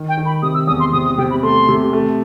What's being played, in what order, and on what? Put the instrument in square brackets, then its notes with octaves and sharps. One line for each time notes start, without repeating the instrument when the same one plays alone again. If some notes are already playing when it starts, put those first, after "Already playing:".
Already playing: [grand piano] D#3
[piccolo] G5
[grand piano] D#3
[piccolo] B5
[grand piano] C3 [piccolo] D#6
[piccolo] E6
[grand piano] E2 [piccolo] D#6
[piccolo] C6
[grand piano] C3 [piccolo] D#6
[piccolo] D#6
[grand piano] C3 [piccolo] G5
[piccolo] B5
[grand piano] A3 [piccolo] C6
[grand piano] C3
A3